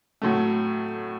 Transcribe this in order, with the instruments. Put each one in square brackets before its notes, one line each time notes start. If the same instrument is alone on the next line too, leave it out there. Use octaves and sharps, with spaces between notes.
[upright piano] A2 F#3 A3